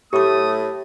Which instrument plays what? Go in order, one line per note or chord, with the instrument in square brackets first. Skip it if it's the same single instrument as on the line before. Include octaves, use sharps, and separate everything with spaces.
[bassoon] A2 [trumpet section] A3 D#6 [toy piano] G4 D6